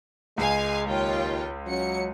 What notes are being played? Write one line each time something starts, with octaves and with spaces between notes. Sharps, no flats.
C#2 G#3 F5 G#5
D#2 F4 C#5 G5
F#3 C#4 C#7